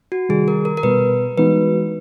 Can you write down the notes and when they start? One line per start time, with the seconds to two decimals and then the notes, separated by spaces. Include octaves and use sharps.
0.12 F#4
0.29 C3 D#3 G3 G#4
0.48 A#4
0.65 A#4
0.77 A#4
0.83 B2 G3 B3 B4
1.38 E3 G#3 B3 D#4 F#4 B4